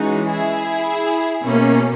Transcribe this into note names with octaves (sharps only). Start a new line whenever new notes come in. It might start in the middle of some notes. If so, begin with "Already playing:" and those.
Already playing: E3 G#3 C#4 D#4 F#4
E4 G#4
B2 A#3 C#4